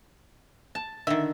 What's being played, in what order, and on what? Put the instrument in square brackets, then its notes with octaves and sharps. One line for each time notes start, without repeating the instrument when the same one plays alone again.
[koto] A5
[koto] D3 D#3 [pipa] E5